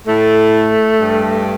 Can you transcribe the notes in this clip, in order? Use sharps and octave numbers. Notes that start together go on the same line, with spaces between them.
A2 A3
G2